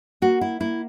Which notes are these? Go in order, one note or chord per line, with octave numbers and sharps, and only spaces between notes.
A#3 F#4
E4
A#3 E4